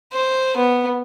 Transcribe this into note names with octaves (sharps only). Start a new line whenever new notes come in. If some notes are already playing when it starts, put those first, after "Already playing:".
C5
B3